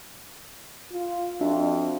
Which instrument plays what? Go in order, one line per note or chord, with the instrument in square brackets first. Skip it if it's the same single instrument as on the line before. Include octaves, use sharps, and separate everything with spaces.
[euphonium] F4
[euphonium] F2 [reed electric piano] D4 F#4 E5